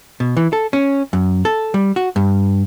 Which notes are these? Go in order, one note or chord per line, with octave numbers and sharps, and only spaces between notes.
B2
E3
A4
C#4
F#2
A4
G3
F#4
G2